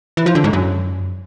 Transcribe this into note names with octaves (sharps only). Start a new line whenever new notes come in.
E3
F3
D3
G#2
F#2